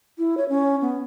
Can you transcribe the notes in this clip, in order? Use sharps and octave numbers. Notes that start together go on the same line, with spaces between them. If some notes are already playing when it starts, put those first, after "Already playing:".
E4
C#5
C#4
B3